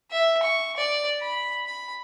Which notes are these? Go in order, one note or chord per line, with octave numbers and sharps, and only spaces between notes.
E5
C#6
D5
B5
B5